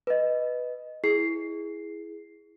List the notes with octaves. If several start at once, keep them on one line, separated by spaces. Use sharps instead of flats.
B4 D#5
E4 G#4 C7